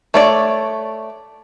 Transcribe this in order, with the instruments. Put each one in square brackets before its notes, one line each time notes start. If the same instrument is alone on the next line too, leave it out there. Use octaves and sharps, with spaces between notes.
[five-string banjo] A3 C#5 D5